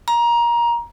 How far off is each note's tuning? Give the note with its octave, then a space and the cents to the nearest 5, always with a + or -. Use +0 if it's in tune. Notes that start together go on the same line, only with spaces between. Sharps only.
A#5 +20